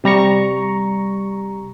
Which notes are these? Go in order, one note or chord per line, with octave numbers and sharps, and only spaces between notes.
C3 G3 A#5 C#6